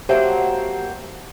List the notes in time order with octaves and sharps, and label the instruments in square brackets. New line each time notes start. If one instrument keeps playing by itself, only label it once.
[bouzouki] F#3 A#3 C4 [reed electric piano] G4 [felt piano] C5 [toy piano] E5 A5